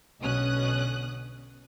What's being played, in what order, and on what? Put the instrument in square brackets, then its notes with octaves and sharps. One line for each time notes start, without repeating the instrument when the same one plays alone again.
[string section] B1 B2 D3 C#4 D#6 F#6